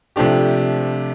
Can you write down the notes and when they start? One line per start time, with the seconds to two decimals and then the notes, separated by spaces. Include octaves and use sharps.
0.16 C3 F3 A3 D4 G4